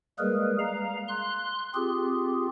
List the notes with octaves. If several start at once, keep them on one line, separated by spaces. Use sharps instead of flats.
G3 G#3 A#3 G#4 A#4 B4
F5 A#5
C6 F#6
C4 F4 G4 G#4